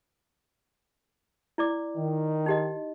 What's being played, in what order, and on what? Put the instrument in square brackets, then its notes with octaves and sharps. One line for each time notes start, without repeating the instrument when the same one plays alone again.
[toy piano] E4 D5 D6
[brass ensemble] D#3
[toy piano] D#4 G4 D#5